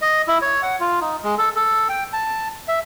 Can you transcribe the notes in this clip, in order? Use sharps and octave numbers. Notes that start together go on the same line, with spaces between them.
D#5
E4
C#5
F#5
F4
D#4
G#3
A4
A4
G5
A5
E5